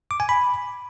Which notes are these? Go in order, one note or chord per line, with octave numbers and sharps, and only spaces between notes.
D6
G#5
B5